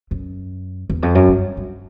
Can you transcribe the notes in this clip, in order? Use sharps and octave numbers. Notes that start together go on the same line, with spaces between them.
F#2
E2
F2
F#2
G2
G2